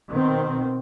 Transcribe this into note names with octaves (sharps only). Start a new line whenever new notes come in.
B2 D#3 C4